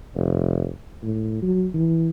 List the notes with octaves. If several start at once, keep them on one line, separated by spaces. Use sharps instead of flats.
F1
A2
F#3
E3